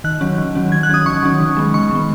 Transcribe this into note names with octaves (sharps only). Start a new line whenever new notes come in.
D#3 F#6
F#3 C#4
D#3
F#3 C#4
D#3 G#6
F#6
F#3 C#4 D#6
D#3 C#6
F#3 C#4
D#3
G#3 B3
D#3 C#6
G#3 B3